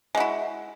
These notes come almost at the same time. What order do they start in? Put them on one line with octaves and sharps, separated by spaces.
G#3 F#4 E4